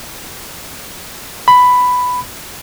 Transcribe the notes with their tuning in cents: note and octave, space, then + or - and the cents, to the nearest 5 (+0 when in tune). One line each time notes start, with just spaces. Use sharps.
B5 +10